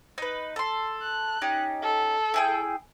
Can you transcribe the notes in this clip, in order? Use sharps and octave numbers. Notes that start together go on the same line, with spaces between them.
D#4 B4
A4 C6
F#6
C#4 D#4 G4
A4
E4 G#4 G5